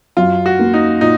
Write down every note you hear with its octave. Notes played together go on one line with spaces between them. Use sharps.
F#2 F4
F#4
A#3
D#4
A#2 D#4